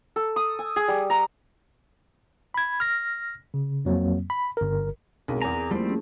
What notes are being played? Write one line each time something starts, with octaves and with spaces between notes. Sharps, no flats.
A4
D#6
G#5
G#4
G3
A#5
B5 G#6
F6 A#6
C#3
F2 F#3 A#3 C4
B5
G1 A#4
B1 G#2 C4 G#4 A#4
E2 G#5 A#5
F3 G3 A3 A#3 C4 E4
C#4 G#4